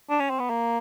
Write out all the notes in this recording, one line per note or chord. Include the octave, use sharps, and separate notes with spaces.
D4
C#4
C4
B3
A#3